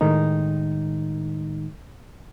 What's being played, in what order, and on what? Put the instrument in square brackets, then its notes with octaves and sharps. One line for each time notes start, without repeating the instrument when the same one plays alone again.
[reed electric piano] A2 D#3 G#3 D#4